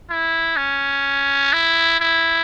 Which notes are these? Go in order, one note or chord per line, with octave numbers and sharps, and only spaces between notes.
E4
C#4
E4
E4